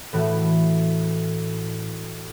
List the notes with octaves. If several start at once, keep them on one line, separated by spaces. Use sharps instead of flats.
A2 E3 A3 F#4